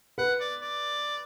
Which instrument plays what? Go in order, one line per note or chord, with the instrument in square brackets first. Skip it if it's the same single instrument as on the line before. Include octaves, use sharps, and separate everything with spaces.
[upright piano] B4 [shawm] F#5
[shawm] D5
D5